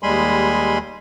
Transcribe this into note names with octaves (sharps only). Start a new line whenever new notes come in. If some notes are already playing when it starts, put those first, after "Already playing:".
D#2 G3 G#3 G#5 B5 C6